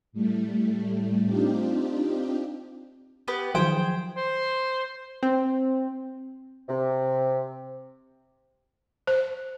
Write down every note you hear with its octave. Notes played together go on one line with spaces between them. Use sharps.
A2 G3 A3
C4 D4 D#4 F4 G4
B3 G4 B4
D#3 F3 F#3 G#4 C5 G5
C5
C4
C3
C5